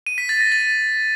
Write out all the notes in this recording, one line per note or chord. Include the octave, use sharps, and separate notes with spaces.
D#7
B6
A6
A#6
A6